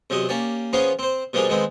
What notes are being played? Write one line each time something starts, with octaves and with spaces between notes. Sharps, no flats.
E2 C3 F#3 D#5
A#3 C#4 G4 D5
F3 B3 C#4 F4 G#4 F5
C4 C5
B2 F3 G3 D4 G#4 A#4
D#3 G#3 B3 C4